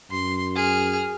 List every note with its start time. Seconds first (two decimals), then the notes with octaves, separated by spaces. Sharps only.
0.11 F#2 C6
0.55 G#4 F6